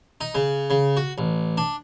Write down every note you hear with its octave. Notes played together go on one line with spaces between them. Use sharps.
D#4
C#3
C#3
F#4
A1
D4